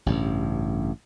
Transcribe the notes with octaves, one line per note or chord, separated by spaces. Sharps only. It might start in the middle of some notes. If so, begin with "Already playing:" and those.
A1 G2 C#3